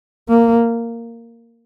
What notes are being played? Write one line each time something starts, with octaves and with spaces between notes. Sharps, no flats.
A#3